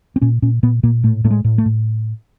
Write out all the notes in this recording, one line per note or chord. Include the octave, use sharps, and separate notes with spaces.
C4
A#2 C#4
A#2 C#4
A#2 B3
A#2 A#3
A2 A3
A2 A3
G#3
A2
A3
A2